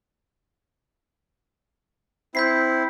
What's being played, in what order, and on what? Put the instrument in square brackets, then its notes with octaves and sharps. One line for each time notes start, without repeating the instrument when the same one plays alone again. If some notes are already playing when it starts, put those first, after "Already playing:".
[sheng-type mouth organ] C4 E4 [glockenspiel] G6 B6 C7